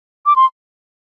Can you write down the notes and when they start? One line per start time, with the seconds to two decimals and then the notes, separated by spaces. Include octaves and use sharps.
0.26 D6
0.36 C6